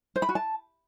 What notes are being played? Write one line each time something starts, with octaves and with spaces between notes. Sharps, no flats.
C5
B5
F#4
A5